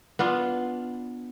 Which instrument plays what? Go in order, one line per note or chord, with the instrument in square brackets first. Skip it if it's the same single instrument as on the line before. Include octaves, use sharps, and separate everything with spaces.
[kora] B3 D4 F4